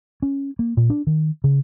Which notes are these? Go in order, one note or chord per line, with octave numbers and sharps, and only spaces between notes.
C#4
A#3
A#2
D4
D#3
C#3